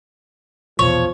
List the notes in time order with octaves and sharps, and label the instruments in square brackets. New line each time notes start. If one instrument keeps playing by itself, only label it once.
[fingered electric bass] A#1 E2 B2 [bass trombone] F3 [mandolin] C#5